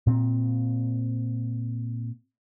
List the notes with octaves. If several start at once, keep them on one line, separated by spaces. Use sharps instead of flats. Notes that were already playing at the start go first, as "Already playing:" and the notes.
A#2 C4